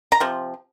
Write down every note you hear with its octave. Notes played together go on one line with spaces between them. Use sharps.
A#5
C3 F3